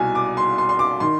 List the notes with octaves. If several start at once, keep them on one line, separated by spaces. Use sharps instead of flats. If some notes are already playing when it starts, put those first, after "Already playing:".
Already playing: C2 B2 G#5
D6
C6
C6
C6
D6
D#3 C6